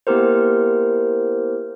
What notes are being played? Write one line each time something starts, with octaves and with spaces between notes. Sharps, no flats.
A#3 B3 E4 G4 A#4 C5